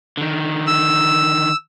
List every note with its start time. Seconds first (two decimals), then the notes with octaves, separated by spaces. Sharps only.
0.17 D3 D#3
0.67 E6